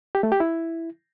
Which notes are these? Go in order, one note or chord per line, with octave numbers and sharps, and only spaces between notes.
G4
A3
G4
E4